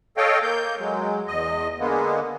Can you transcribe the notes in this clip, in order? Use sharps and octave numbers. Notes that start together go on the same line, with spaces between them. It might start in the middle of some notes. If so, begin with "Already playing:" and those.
A4 C#5 D#5 F5 G5
A#3 G6
F#3 G#3
E2 D#5
D3 G#3 A#3 B3